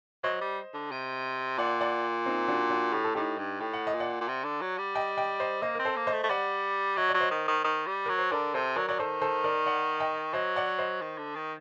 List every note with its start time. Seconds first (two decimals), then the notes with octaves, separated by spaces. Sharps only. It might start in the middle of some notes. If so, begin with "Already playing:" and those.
0.24 F#3 C5 D#5
0.41 G3
0.74 D3
0.91 C3
1.58 A#2 D5 F#5
1.81 D5 F#5
2.25 C4 D#4
2.48 D4 F#4
2.70 D4 F#4
2.93 A2 G4
3.04 A4
3.15 A2 D#4 G4
3.38 G2
3.60 A2 G5
3.73 F#5
3.87 D#5
3.94 A#2
4.00 D5 F#5
4.21 A#2
4.28 C3
4.44 D3
4.61 F#3
4.78 G3
4.95 D#5 G5
5.17 D#5 G5
5.40 C5 D#5
5.62 A#3 C5 D#5
5.75 C4 A#4
5.85 A4 C5
5.96 A#3
6.07 C5 D#5
6.13 A3
6.23 A3
6.29 G3 D5 F#5
6.97 F#3 D#5
7.09 D5
7.14 F#3
7.21 C5 D#5
7.31 D#3
7.48 D#3
7.64 D#3
7.87 G3
8.06 F#3 A#4
8.19 C5
8.32 D3 A#4 D5
8.54 C3 A4 C5
8.76 F#3 A#4 D5
8.88 F#3 D5
8.99 D#3 A4 C5
9.21 A4 C5
9.44 A#4 D5
9.66 D5 F#5
10.00 D#5 G5
10.33 F#3 C5 D#5
10.56 D5 F#5
10.79 C5 D#5
11.01 D#3
11.18 D3
11.35 D#3